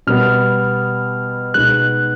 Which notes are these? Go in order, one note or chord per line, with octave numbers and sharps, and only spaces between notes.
B2 G3 B3 F6
B2 G#3 B3 D#4 F#6